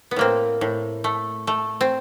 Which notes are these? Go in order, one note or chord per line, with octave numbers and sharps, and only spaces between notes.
B3
A2 A#3 C4
A2
A3
A3
C4